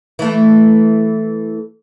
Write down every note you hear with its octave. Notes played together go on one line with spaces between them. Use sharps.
E3 A3